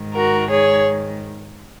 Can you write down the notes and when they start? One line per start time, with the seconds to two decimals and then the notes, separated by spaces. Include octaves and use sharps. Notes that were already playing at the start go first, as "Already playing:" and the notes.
Already playing: G#2 D#3
0.14 F#4 A#4
0.50 G#4 C#5